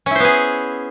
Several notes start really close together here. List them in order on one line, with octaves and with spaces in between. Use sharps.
C#4 E4 C5 B3 G#4